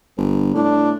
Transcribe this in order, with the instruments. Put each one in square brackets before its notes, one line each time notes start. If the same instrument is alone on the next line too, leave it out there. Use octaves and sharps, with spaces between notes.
[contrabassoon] G1
[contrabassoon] A2 [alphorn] D4